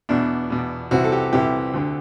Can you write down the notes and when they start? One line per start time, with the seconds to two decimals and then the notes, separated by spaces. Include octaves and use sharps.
0.09 E2 B2 D4
0.50 E2 B2
0.91 C2 C3 E3 F#4
1.04 A4
1.12 G4
1.32 C2 C3 E3 G4
1.74 D2 D3